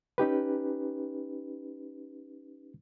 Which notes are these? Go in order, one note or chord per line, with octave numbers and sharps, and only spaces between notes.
C#4 D#4 G4 B4